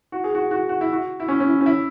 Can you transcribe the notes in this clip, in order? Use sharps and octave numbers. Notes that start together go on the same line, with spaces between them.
F#4
G#4
F#4
F#4
F#4
E4
F#4
E4
C#4
C#4
E4
C#4
E4